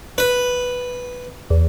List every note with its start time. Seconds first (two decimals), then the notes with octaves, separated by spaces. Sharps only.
0.18 B4
1.50 E2